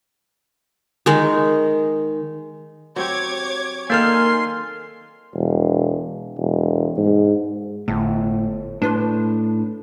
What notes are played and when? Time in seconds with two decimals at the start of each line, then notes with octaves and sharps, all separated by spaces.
1.06 D#3 G#3 D#4
2.96 F#3 C4 G4 C#5 D6 G#6
3.90 D#3 A#3 A4 A#4 D5 G#5 C6 F6
5.34 E1
6.38 E1
6.97 G#2
7.88 G1 A2
8.82 A2 D4 B4 C6